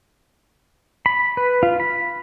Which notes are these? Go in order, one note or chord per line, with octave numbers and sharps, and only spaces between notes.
B5
B4
F4
B5